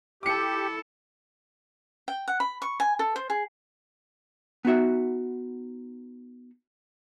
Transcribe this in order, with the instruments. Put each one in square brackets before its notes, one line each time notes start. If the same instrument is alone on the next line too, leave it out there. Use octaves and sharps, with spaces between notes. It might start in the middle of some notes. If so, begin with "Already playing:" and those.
[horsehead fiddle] E4 A4 [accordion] G4 [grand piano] D6 C#7
[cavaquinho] G5
F#5
B5
C#6
G#5
A4
C5
G#4
[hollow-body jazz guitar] B3 D#4 F#4 E5